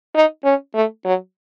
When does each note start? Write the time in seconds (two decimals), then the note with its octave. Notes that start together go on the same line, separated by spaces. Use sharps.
0.15 D#4
0.44 C#4
0.75 A3
1.05 F#3